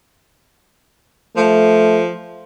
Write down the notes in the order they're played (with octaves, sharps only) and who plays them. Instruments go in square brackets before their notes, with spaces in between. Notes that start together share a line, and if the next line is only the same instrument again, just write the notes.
[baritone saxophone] F3 [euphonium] A3